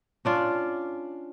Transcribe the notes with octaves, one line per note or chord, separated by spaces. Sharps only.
C#4 D4 F4